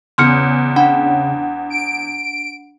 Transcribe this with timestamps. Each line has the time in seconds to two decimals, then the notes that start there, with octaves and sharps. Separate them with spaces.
0.18 E2 C#3 C6 F6 C#7
0.76 D4 F#5 B5
1.70 D7